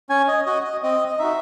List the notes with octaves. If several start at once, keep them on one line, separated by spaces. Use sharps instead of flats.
C#4 G#5
D#5
F#4 D#5
D#5
C4 D#5
D#5
D#4 F#4 E5